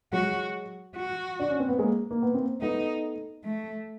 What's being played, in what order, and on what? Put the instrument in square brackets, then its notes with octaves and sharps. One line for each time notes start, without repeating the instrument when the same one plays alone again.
[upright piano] F#3 G#3 [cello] F#4
[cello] F#4
[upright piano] D4
C#4
C4
B3
G#3 A#3
A#3
B3
A#3 C4
[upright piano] A3 B3 [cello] D#4
[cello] A3